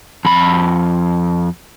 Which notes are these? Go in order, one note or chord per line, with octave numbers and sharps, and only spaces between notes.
F2 B5